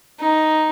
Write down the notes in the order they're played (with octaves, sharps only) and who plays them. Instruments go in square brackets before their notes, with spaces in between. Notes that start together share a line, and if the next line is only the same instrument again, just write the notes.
[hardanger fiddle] D#4